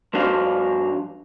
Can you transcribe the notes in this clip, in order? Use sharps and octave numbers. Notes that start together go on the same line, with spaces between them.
G2 F3 D4 F#4 F5